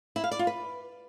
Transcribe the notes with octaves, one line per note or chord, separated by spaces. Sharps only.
E4
F5
D5
F4
B4